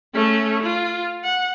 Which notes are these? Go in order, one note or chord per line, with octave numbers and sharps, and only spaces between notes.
A3 C#4
F4
F#5